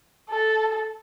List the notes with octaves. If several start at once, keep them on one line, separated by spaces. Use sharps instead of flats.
A4